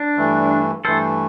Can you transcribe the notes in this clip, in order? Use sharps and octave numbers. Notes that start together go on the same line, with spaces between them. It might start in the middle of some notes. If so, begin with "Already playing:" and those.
Already playing: D4
G2 E3 A3
G2 E3 A3 A4 C5